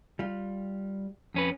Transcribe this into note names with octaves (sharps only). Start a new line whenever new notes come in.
G3 F4
F2 C#4 B4